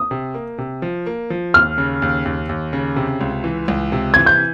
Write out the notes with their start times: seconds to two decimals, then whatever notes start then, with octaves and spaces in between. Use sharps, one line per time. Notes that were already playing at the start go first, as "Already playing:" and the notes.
Already playing: D#6
0.11 C3
0.34 A#3
0.58 C3
0.82 F3
1.06 A#3
1.30 F3
1.54 D#2 F6
1.78 C#3
2.02 D#2
2.25 D#2
2.49 D#2
2.73 C#3
2.96 C3
3.21 C#2
3.44 E3
3.68 C#2
3.92 C3
4.14 E3 G#6
4.26 G6